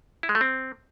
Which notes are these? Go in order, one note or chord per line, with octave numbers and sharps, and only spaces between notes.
E4
G#3
A3
C4